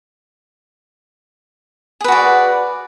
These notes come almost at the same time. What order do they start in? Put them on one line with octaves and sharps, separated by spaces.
G#4 B4 F#4 D5